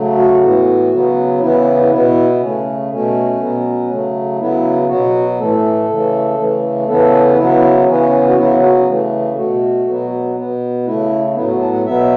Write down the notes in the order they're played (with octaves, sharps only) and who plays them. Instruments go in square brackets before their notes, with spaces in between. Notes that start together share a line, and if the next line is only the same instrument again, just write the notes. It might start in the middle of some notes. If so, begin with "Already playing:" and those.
Already playing: [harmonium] C#3 F#3 A3
F#4
A2 E3 B3
C#3 F#3 B3
C#3 E3 B3 E4
B2 B3 E4
C#3 A3 C#4
B2 A3 C#4
B2 F#3 B3
C#3 F#3 A3
C#3 F#3 B3 E4
B2 F#3 B3 F#4
A2 E3 A3 A4
C#3 E3 A3
C#3 E3 A3
C#3 E3 B3 A4
C#3 F#3 B3 E4
C#3 E3 B3 C#4
F#4
C#3 F#3 B3 E4
F#4
C#3 E3 A3
B2 A3 F#4
B2 F#3 B3
B2 B3
C#3 A3 E4
A2 F#3 B3 E4
F#4
A5
F#5
B2 F#3 B3 E5